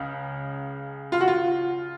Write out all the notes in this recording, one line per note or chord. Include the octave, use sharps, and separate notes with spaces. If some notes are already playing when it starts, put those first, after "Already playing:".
Already playing: C#2 C#3
F4
F#4
F4